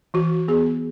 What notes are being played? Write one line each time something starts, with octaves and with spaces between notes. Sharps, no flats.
E3 F#4
B3 G#4